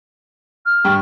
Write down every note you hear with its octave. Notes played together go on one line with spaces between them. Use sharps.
F6
G2 G5 C#6